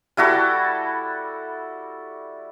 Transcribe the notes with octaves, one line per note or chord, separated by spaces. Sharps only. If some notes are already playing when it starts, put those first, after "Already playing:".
G3 E4 F#4 A4